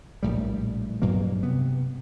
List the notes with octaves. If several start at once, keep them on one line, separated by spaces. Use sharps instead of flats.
A#1 A2 G3
G2 B2 F#3 A#3
C3 B3